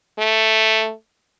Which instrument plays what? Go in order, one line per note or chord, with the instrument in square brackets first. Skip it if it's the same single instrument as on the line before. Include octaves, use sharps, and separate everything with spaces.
[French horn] A3